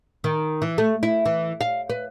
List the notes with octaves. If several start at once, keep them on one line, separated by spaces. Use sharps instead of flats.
D#3
E3
A3
E4
E3
F5
B4